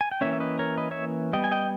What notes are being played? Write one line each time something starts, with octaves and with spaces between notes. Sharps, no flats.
G#5
G5
E3 A#3 C#4 C#5 E5
E5
B4 D#5
A#4 C#5
B4 D#5
C#5 E5
G3 B3 D#5 G5
G#5
D#5 G5